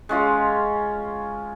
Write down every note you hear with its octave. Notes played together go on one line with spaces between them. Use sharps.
G#3 C#4 F4